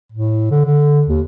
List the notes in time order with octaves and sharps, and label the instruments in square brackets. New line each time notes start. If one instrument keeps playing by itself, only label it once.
[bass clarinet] A2
D3
D3
D#2